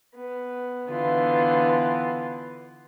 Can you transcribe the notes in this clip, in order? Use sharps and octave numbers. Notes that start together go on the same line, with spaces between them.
B3
D3 E3 B3 F4